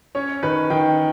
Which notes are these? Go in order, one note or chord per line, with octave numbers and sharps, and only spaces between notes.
C#4 C#5
D#3 B4
D#3 G5